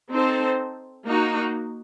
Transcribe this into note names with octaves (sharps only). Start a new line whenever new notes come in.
C4 D#4 A4 C5
A#3 D#4 F#4